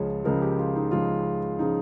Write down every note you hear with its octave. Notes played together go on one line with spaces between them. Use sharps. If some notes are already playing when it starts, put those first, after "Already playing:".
Already playing: C#2 C#3 F3 G#3 C#5
C#2 C#3 F3 G#3 A#4
G4
F4
D#4
C#2 C#3 F3 G#3 F4
C#3 F3 G#3 D#4